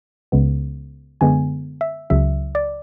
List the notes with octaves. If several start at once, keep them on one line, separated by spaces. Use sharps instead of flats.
C#2 C#3 G#3 B3
F#2 D3 G#3 B3 G#5
E5
C#2 C#3 F#3 E5
D5